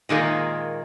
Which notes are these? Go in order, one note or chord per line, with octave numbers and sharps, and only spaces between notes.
A#2 D#3 G#3 A#3